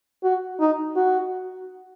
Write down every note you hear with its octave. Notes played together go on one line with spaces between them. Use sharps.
F#4
D#4
F#4